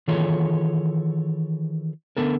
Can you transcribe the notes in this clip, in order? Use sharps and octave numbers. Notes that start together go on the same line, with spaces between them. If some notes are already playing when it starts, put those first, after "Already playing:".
D#3 E3 F4 G#4 A4 C#5
D3 B3 A4 A#4